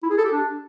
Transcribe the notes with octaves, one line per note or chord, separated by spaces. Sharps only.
E4
G#4
A4
G4
D4